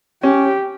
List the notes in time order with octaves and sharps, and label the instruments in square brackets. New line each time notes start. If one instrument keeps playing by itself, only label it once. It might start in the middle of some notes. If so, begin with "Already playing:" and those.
[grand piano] C#4 [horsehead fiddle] G4